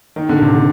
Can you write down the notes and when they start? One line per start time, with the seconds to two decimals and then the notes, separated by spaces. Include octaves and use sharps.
0.16 D#3
0.29 D3
0.42 C3
0.55 D3